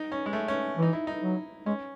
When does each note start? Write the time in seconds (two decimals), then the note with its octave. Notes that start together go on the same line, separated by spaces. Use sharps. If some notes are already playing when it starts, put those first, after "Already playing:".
Already playing: D#4
0.12 C#4
0.26 G#3
0.33 A3
0.48 C#4
0.77 E3
0.83 D#4
0.93 E4
1.07 D#4
1.22 F#3
1.66 G#3 C#4